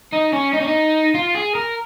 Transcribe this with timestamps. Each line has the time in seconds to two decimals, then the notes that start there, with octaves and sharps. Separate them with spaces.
0.12 D#4
0.33 C#4
0.53 D#4
0.61 C#4
0.67 D#4
1.15 F4
1.35 G#4
1.55 A#4